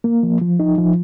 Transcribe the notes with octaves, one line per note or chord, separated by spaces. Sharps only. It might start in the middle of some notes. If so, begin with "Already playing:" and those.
A#3
F3
F3
D#4
F3